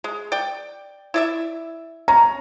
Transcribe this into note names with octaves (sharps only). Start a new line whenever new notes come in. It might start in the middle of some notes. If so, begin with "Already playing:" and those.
G#3
D5 G5
E4 D5 E5
C#4 A#5